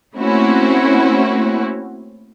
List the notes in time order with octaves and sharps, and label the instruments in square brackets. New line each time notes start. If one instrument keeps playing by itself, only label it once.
[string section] A3 A#3 C4 C#4 E4 F#4